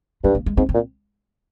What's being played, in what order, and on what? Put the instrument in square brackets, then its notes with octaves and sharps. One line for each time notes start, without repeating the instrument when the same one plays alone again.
[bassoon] G2 [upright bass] G#3
[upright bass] A#3
G#3
[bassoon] G#2 [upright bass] C4
[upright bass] C4
[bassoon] A#2